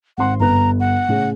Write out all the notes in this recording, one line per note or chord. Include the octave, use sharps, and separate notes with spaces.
G#1 C4 F#5 C6
G1 B4 A#5 F#6
F#5
A2 C#3 G#4